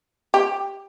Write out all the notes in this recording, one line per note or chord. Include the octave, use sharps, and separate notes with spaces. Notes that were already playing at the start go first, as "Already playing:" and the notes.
G4